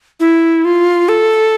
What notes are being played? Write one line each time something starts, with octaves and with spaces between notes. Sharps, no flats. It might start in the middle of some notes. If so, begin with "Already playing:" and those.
E4
F4
A4